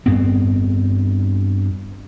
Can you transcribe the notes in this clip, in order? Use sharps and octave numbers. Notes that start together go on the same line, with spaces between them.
G2 B3 C4